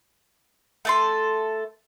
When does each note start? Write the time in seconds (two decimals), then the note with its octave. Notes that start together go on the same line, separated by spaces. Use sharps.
0.85 A3 A4 C6